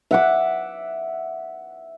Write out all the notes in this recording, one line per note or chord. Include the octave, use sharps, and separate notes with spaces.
E5 F#5 D6